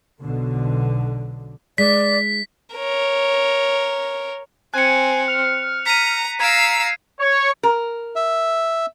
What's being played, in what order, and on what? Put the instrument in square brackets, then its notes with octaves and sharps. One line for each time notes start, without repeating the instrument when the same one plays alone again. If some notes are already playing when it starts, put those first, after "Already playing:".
[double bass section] B1 B2 D3
[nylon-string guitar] G#3 [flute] D5 [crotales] B6
[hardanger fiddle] A#4 C#5
[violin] C4 [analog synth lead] G#5 [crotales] F#6 C#7
[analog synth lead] F6
[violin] A#5 [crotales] B6 D#7
[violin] F5 E6 [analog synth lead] A#5 [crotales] G#6 C7 D7
[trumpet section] C#5
[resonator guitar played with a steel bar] A#4
[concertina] E5